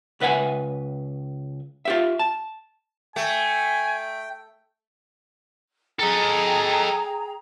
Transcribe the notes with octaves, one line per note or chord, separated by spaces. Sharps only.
C#2 B4 E5 F#5 G#5
F4 G4 E5
A5
A3 G5 G#5
G#4 A4 D#5 G5 A#5